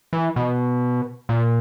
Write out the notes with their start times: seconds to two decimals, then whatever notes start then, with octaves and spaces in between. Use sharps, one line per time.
0.13 E3
0.36 B2
1.29 A#2